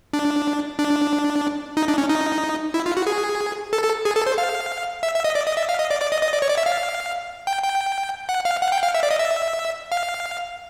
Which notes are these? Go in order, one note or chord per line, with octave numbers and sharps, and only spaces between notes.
D4
D4
D#4
D4
C#4
D#4
E4
F4
F#4
G#4
A4
A4
G#4
A4
C5
F5
E5
E5
D#5
D5
D#5
E5
F5
D#5
D5
D5
D#5
D#5
D5
C#5
D5
E5
F5
G5
G5
F#5
F5
F#5
G5
F5
E5
D5
D#5
E5
F5